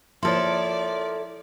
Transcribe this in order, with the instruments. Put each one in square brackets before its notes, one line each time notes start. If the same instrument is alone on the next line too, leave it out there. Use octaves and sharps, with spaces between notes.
[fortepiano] F3 A#3 [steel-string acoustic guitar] E4 A4 [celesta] C#5 C6 [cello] D5